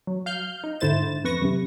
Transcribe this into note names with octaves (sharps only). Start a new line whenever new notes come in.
F#3
F5 F6 G6
D#4
G#2 D3 E4 C5 A6 E7
F2 B4 C#6 A#6
F#2 C3